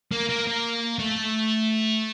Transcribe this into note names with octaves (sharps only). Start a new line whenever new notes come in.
A#3
A#3
A#3
A3